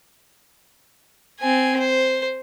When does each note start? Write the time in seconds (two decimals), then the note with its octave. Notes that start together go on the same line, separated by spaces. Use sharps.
1.40 C4 G#5
1.80 C5